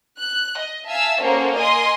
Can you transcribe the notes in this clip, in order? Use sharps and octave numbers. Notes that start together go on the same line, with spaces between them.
F#6
D#5
E5 F5 G#5 A5 E6
A#3 C#4 F#4 A4 A#4 C5
A#4 D#5 G#5 C6 D#6